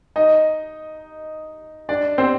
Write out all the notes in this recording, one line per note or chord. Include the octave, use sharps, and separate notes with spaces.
D#4 D#5
D4 D5
C4 C5